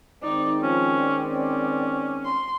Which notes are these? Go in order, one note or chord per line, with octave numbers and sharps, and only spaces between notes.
D#3 G#3 C4 D#4 D5
F3 C#4
D5
C#4
C6